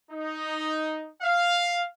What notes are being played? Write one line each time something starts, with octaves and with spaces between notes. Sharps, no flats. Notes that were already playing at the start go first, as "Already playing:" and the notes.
D#4
F5